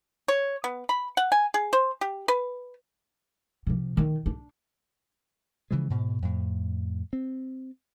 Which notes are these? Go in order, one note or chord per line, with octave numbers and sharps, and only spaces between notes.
C#5
B3
B5
F#5
G#5
G#4
C5
G4
B4
C3 F3
D#3
D4
C#3 E3 F3 G#3
G#2 B2
F2 A2
C4